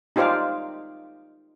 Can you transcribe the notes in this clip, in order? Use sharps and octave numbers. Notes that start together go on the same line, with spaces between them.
D#4 F4 G4 C5 D5 F5